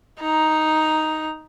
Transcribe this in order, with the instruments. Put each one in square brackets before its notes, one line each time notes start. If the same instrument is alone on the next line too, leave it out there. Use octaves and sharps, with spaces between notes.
[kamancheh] D#4 A#5